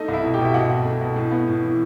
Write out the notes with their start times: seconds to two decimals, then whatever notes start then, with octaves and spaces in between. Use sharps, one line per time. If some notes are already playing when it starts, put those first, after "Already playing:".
Already playing: A3 D#4 D#5
0.08 C2
0.13 E4 E5
0.23 B2
0.34 G4 G5
0.39 B2
0.45 E5
0.54 B2 F#4 F#5
0.70 C2
0.85 A3
1.01 B2
1.16 A2
1.31 B3
1.48 A2
1.63 E3